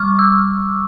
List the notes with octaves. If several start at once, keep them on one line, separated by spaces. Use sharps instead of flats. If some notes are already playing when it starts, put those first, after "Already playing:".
Already playing: G3 C#6 D6 F6
E6